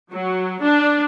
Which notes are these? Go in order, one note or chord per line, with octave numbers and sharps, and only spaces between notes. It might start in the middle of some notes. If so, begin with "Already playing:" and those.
F#3
D4